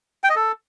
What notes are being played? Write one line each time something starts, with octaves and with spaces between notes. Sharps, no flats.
G5
D#5
A4